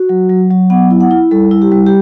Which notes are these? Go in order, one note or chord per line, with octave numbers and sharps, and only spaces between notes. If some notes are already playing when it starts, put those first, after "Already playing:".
Already playing: F#4
F#3
F#3
F#3
B3 F#5
E4
F#5
E4
G3 A4
E4
G4
G3
G4